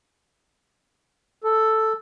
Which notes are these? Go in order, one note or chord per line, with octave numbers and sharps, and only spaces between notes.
A4